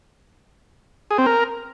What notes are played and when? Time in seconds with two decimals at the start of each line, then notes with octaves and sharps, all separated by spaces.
1.11 G#4
1.18 C4
1.26 A#4